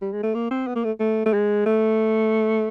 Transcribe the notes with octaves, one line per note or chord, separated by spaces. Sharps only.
G3
G#3
A3
A#3
C4
B3
A#3
A3
A3
A3
G#3
A3